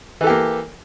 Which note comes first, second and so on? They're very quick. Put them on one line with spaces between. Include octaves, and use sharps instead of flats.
E3 A4 G4 A#3